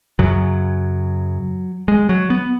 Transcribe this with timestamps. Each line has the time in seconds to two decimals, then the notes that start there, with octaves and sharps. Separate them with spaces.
0.19 F#2 C#3 F#3
1.88 G#3
2.09 F#3
2.30 B3